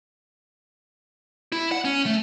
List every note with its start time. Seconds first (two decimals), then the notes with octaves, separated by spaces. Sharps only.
1.52 E4
1.72 F#5
1.85 C#4
2.06 A3